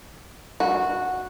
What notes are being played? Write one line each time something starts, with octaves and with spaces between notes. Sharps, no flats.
F#4